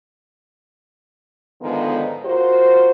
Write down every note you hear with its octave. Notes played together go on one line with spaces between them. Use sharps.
G#2 D3 D#3 F3 B3
F4 F#4 A#4 C5